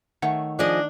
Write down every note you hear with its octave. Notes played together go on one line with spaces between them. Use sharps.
D#3 A3 C#5 F#5
F3 D4 G#4 D#5